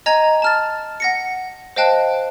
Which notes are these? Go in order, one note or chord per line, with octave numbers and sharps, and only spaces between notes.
D#5 G#5 A#5 G#6
A5 F6 A6
F#5 A#6 C#7
C5 D#5 F5 G5 A5 F#6